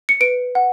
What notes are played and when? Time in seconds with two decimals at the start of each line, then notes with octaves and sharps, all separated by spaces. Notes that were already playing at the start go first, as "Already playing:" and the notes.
0.09 C#7
0.21 B4 D7
0.55 F#5